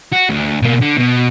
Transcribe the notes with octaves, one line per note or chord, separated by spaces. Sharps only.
F#4
D2
B2 A#3
D3
B2